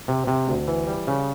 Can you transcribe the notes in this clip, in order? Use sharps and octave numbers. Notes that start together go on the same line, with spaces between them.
C3
C3
D2
E3
G3
C#3